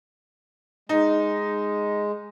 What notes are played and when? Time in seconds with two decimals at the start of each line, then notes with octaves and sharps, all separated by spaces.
0.89 G#3 D#4